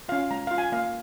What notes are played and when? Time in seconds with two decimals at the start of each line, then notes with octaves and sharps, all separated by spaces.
0.09 C#4 F4 F5
0.31 G#3 A#5
0.47 F4 F5
0.58 G#5
0.72 A#3 F5